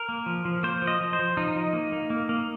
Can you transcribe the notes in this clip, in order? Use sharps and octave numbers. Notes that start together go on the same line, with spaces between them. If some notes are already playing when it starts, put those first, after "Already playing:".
Already playing: A#4
A#3
F3
F3
A#3 C5
F3
D#5
F3
C5
F3
F3 D#4
F3
A#3
A#3
A#3
A#3